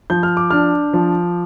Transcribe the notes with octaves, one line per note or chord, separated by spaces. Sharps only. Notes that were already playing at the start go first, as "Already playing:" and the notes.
F3 G6
F6
D6
D4 F6
F3